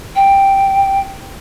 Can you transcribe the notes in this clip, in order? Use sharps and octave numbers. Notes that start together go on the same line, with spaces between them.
G5